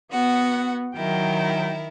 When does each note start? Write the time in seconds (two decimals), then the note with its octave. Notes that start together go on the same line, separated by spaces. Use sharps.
0.13 B3 F#4 F#5
0.97 D#3 F#3 E4 A#4 G5